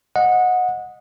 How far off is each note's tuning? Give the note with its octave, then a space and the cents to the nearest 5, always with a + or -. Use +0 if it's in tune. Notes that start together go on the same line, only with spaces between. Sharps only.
D#5 +0 F#5 -20